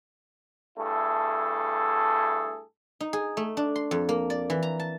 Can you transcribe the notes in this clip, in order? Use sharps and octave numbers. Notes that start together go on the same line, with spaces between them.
G2 A3 E4 G#4 A4
D#4
G#4
A3
D4
C6
F2
A#3
D5
E3
A#5
A5